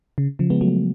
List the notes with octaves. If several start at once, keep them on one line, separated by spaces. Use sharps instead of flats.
C#3
C#3 F3
G#3 B3
F#3 A3